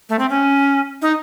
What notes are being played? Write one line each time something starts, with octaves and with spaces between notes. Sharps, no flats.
A3
C4
C#4
D#4